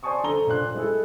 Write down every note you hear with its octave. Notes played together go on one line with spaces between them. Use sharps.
C5 D5 G#5 A5 C#6 D#6
D3 A4 A#5 G7
A#2 D4 C5 F#6
G#3 E4 A4